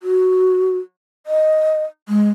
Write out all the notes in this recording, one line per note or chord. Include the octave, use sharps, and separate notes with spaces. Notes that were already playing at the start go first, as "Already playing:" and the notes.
F#4
D#5
G#3